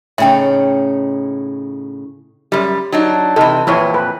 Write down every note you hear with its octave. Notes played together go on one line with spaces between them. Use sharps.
A2 C#3 D#4 E5 G5
F#2 G3
F#3 D4 D#4
C3 E3 D#4 A4
F2 A#2 E3 C4 E4 C#5
B4